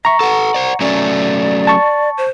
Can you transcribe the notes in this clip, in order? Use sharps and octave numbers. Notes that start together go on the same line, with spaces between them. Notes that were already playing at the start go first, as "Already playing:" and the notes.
E5 A#5 C#6
A4 B4 F#5
C5 D5
F#3 A3 C#4 D5
A5 C#6
C5